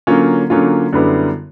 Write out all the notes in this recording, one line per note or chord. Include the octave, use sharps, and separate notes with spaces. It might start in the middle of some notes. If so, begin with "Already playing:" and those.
D3 F#3 A#3 C#4 F4
D3 F#3 A#3 C#4 F4
F#2 D3 G3 B3 E4